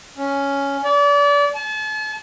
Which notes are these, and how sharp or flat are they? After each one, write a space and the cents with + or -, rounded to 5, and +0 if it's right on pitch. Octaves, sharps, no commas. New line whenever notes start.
C#4 +5
D5 -35
A5 -40